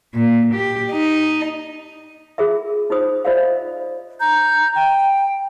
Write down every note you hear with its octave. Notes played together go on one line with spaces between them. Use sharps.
A#2
G4
D#4
F4 G#4 A#4 E5
D#4 F4 C5 D#6
F4 C5 D5 E5 F5
D#5
A#5 G6
G5